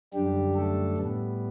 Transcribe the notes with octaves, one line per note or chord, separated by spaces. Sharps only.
F#2 D3 G3 D4 G4
A3 A4
A2 G3 B3